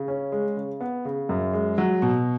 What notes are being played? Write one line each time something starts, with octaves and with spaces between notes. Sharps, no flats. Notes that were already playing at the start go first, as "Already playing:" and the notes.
Already playing: C#3
C#4
G#3
C#3
B3
C#3
F#2
G#3
F#3
B2